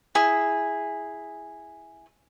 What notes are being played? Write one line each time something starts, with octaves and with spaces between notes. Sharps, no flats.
E4 G#4